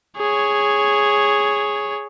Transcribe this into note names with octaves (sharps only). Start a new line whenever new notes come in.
G#4 C#5